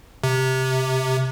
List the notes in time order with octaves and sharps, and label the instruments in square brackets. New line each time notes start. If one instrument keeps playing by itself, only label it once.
[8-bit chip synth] C3